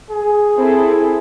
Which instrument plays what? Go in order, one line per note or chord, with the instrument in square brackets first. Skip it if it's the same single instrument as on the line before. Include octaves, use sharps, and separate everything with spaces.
[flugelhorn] G#4
[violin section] C4 E4 A4